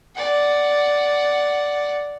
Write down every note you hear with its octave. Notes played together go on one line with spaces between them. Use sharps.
D5 F#5